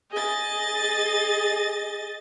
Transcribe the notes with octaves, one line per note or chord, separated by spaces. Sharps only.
G#4 D#5 A6